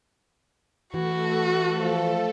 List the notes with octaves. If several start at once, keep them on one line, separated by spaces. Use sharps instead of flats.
E3 A3 F#4 A4
F3